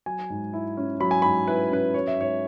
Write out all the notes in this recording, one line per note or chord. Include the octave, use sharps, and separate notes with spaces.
F#3 G#5
G#2
E4
C#4
F#3 B5
G#5
G#2 B5
E4 B4
C#4 B4
F#3 C#5
E5
G#2 C#5